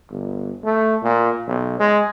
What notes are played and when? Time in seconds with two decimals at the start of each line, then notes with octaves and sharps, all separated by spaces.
0.10 G1
0.65 A3
1.03 A#2
1.47 B1
1.80 G#3